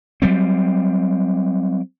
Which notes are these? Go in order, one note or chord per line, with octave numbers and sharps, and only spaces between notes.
F#3 G3 C4